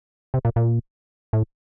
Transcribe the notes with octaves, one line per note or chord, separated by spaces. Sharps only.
C3
A#2
A#2
A2